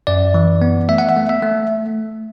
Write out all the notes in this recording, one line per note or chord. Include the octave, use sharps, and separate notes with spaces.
F#2 D5
E3
B3
A3 E5
F#5
E5
A3
E5
A3